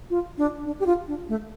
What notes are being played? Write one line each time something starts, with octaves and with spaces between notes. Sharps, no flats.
F4
D4
D4
G4
F4
D4
A3